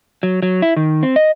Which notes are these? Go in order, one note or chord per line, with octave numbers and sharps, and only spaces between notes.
F#3
F#3
E4
D#3
C4
D#5